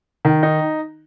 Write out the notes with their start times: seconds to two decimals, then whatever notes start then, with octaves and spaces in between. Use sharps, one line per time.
0.25 D#3
0.43 D#4